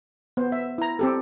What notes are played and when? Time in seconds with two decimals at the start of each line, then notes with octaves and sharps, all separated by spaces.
0.37 B3 C5
0.52 E5
0.78 E4 A#5
0.99 C4 G4 A4